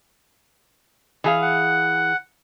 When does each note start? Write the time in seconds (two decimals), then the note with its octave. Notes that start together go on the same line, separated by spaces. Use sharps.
1.24 E3 G#4 F5
1.42 F#5